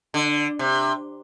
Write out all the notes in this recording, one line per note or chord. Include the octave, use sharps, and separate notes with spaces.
D3
C3